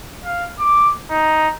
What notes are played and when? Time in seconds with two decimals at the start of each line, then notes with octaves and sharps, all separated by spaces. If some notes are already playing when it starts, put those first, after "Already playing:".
0.24 F5
0.60 D6
1.11 D#4